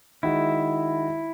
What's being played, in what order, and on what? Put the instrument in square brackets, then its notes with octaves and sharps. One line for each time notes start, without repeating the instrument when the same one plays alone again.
[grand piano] D#3 G#3 D#4 F#4 [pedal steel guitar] E4